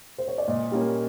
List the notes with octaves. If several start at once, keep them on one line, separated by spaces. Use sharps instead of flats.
C5
C#5
D5
A#2 D#5
G3 A#3 C#4